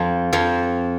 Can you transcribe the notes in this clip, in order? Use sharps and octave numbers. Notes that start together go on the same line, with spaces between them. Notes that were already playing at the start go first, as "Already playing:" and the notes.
Already playing: F2 F3
F2 F3